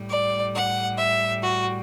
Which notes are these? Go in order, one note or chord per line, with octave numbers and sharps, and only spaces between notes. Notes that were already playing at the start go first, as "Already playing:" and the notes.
Already playing: A2 G3
D5
F#5
E5
F#4